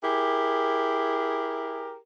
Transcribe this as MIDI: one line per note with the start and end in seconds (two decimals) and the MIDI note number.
0.03 1.95 64
0.03 1.95 67
0.03 1.95 68
0.03 1.95 70